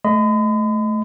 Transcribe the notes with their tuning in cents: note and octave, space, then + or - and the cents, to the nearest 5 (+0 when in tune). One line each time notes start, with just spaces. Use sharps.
A3 -20 D#5 +0 B5 +45